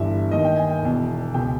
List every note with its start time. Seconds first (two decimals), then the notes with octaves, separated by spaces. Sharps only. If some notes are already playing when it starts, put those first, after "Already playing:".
Already playing: G1 G2 E3 E5
0.31 D#2 D#3 D#5
0.45 G5
0.56 G#5
0.70 G5
0.82 E1 E2 B2
1.34 C#2 B2 G5